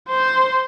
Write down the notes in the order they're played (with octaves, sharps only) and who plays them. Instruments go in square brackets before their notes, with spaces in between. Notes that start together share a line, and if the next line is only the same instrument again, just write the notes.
[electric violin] C5